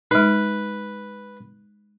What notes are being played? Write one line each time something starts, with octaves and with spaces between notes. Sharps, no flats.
G#3 D#4 B4